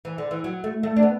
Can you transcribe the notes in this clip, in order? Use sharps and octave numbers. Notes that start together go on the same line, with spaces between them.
E3
D3
E3
F#3
A3
A3
D4
B3